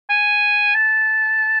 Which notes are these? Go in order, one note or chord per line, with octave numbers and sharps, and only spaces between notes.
G#5
A5